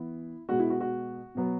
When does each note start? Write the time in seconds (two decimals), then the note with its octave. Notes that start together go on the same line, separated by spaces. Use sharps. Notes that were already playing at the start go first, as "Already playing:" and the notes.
Already playing: E3 B3 E4
0.49 B2 G#3 B3 F#4
0.60 E4
0.70 F#4
0.80 F#4
1.35 B2 F#3 B3